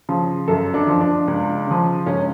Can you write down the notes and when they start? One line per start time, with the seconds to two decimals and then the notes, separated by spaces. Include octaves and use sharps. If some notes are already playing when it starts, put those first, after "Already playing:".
0.09 C#3 F3
0.48 F#2 A4
0.74 D4
0.87 F3
1.01 D4
1.28 C#2
1.67 C#3 F3
2.06 C#2 C#4